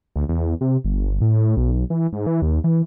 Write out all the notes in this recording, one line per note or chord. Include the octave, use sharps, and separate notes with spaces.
D2
E2
C3
G1
A2
B1
B1
E3
G#2
E3
D#2
E3